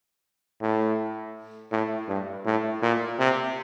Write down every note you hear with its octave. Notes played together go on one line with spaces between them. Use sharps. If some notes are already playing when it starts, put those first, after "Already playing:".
A2
A2
G2
A2
A#2
C3